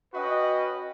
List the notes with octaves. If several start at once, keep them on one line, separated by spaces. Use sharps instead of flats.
C#4 F#4 B4 D#5 G5